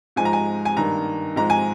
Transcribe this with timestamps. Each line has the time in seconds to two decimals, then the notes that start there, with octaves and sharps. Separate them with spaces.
0.16 G#2 F3 G#3 G#5
0.25 A#5
0.33 G#5
0.65 G#5
0.76 G2 D#3 A#3 A#5
1.36 G#2 F3 G#3 C4 A#5
1.50 G#5